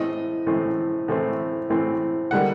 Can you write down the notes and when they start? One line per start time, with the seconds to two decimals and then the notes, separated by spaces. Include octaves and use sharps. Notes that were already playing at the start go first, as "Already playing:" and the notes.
Already playing: A2 E3 A3 C4 D#5
0.47 A2 E3 A3 C4
1.08 A2 E3 A3 C4
1.70 A2 E3 A3 C4
2.31 D3 G3 A#3 F#5